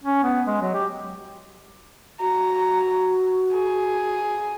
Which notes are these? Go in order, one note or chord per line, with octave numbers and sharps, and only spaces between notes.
C#4
B3
G#3
F#3
G4
F#4 A#5
G#4